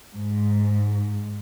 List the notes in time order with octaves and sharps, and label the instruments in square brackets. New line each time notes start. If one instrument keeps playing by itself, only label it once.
[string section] G#2